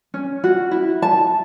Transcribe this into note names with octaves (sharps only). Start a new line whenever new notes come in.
C#4
F#4
E4
A5